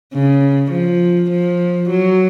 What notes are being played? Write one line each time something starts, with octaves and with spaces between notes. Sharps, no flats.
C#3
F3
F3
F#3